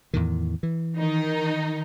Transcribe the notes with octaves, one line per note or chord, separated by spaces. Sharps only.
E2 A2 D#3
E3
D#3 D#4